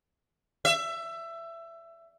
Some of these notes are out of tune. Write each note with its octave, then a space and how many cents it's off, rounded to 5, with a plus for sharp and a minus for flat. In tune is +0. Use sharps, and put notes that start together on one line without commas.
E5 +20